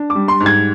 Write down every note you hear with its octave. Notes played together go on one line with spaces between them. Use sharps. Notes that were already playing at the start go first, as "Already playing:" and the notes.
Already playing: D4
D6
G3
C6
G#2
G#6